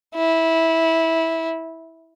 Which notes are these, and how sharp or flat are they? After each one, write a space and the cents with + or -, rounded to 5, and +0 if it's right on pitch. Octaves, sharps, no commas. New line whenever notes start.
E4 -15